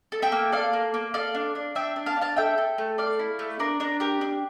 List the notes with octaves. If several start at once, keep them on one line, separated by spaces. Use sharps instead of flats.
A4
E5 G5
A#3
A4 D5 F5
A#3
A#3
A4 D5 F5
D4
D4
D4 E5 G5
D4
F5 A5
D4
F5 A5
A4 E5 G5
A4
A3
A4 D5 F5
E4
A3
D4 A#4 D5
D4 A#4
G4 A#4
D4